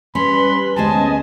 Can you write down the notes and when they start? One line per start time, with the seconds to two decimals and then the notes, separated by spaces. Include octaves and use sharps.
0.15 G3 C#4 B4 B5 C6
0.76 D2 G#3 B3 C#4 C5 D#5 G#5 A5